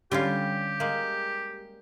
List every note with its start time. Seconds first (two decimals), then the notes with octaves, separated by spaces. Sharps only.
0.12 D3 G3 C#4 F4 G4
0.80 G#3 A#3